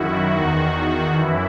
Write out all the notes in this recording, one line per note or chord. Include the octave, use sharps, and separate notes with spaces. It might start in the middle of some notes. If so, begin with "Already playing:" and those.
Already playing: F#2 D#3 E4 F#4
E2 D#3 F#4
F#2 E3 E4